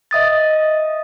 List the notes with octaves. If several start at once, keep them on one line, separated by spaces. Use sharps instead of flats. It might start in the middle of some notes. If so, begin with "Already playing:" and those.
D#5 E5 D#6 A6